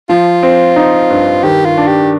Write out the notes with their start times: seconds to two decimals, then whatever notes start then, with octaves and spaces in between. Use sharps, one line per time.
0.09 F3 F4
0.43 C4
0.76 D#4
1.10 G2
1.44 D#3 G4
1.65 F4
1.77 D4
1.88 G4